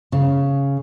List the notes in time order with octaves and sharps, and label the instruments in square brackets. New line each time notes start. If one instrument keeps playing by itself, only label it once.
[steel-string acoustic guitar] C#3